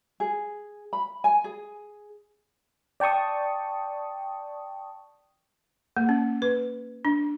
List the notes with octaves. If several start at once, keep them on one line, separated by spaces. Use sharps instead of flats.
G#4
B5
G#5
G#4
D5 G5 A5 C#6 D#6
A#3
C#4
B4
D4